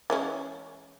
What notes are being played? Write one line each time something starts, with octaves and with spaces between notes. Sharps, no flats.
E3 G#3 C#4